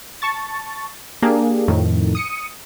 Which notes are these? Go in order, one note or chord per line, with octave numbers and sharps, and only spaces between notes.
A5 C#6 A6
A#3 D4 G4 G#4
F2 A2 D#3
D#6 C#7 D#7